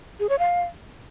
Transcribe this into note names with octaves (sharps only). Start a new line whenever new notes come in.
G#4
C#5
F5